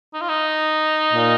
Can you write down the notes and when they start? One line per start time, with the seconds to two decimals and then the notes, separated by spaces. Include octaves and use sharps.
0.14 D#4
0.21 F4
0.29 D#4
1.13 A#2